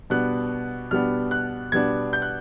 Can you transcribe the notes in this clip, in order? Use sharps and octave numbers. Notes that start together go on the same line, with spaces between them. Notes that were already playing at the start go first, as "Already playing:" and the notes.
B2 G3 B3 D4 F#6
B2 G3 B3 D4 F6
F#6
B2 G3 B3 D4 G#6
G6
F#6